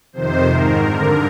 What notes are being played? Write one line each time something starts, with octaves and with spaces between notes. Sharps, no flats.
F2 C3 D#3 C5
G#2 D#3 A#4
G2 D3